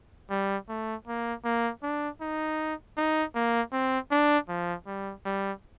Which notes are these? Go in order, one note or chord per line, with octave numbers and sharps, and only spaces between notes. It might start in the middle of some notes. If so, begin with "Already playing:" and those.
G3
A3
A#3
A#3
D4
D#4
D#4
A#3
C4
D4
F3
G3
G3